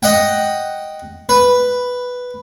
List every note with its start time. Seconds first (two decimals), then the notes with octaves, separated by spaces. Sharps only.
0.03 D#5 F#5 G5
1.29 B4